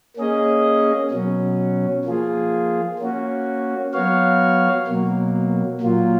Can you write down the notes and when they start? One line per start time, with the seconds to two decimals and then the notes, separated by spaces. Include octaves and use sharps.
0.17 A#3 C#4 G#4 D#5
1.11 B2 F#3 C#4
2.05 F3 A#3 F4 G#4
2.99 A#3 C#4 F#4
3.93 F#3 B3 F#4 C#5 F5
4.87 B2 F#3 A#3
5.81 A#2 F#3 A#3 F4